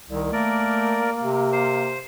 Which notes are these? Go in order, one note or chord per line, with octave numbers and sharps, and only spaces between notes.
C2 D#3
A3 A#3 A#4 D5
C3
C5